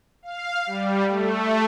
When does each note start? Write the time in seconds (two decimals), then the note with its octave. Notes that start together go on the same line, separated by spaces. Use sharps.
0.23 F5
0.67 G3
1.09 A3